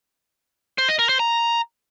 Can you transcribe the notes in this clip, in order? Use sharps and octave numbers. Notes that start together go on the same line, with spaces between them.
C5
D#5
A#4
C5
A#5